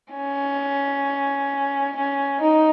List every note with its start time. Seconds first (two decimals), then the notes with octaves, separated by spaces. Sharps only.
0.13 C#4
1.96 C#4
2.40 D#4